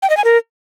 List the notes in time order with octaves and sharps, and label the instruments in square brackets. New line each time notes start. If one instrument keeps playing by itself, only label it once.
[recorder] G5
D#5
G#5
A#4